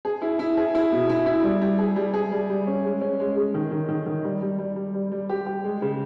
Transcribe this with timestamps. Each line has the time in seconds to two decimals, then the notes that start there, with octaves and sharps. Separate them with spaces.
0.05 G#4
0.22 E4
0.39 E4
0.57 G#4
0.75 E4
0.92 B2
1.09 E4
1.26 E4
1.44 G3
1.62 G3
1.78 G#4
1.96 G3
2.14 G#4
2.32 G3
2.50 G3
2.67 C#4
2.85 G#3
3.01 C#4
3.20 G#3
3.36 G#3
3.54 D#3
3.71 D#3
3.89 D#3
4.06 D#3
4.25 G3
4.42 G3
4.59 G3
4.76 G3
4.94 G3
5.12 G3
5.29 G4
5.46 G4
5.64 G#3
5.82 C#3